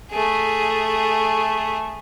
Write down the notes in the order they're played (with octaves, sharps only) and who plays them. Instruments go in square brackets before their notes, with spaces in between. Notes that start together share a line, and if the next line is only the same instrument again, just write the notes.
[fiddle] A3 G#4